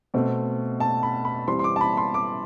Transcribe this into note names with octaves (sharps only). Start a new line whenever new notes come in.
B2 A3 C4
A5
B5
B5
E3 G3 C4 C6
C6
D6
A5
B5
C6
D6